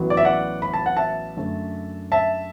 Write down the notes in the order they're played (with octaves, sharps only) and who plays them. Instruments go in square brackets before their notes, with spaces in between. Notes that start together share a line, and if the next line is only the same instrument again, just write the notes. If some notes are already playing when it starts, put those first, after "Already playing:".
Already playing: [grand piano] A1 A2 F#3 B3
D5
E5
D5 F#5
B5
A5
F#5
E5 A5
F#2 D3 A3
E5 A5